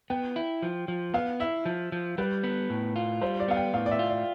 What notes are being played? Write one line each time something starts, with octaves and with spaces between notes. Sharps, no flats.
B3 G5
E4
F3
F3
B3 F5
E4 E5
F3
F3
G3 B4
B3
A2
F4
G3 C5
D5
B3 F5
G5
A2 F5
D5
E5
F4
D5